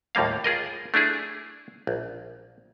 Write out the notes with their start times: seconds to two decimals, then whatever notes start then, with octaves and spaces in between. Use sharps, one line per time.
0.15 D#2 A2 G3 A#3 F5
0.44 F4 G#4 A#4 D#5
0.94 A3 D4 E4 G#4
1.87 A#1